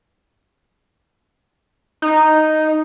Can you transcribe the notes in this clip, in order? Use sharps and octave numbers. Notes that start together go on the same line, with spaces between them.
D#4